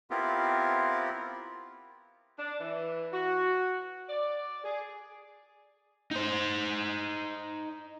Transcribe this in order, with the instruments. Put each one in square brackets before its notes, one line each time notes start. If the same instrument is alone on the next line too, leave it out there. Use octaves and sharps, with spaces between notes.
[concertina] B3 C4 E4 F4 G4 A#4
[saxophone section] D4
E3
F#4
D5
G#4
[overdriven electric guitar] D#4 C5